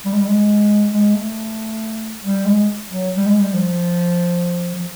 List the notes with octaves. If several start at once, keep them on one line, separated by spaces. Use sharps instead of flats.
G3
G#3
G3
G#3
G#3
A3
G3
G#3
F#3
G3
G#3
G3
F3
F3